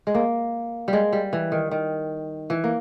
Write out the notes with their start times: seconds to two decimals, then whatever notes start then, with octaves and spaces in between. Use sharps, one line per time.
0.07 G#3
0.15 A#3
0.88 G3
0.93 G#3
1.13 G3
1.33 E3
1.52 D#3
1.71 D#3
2.50 E3
2.64 A#3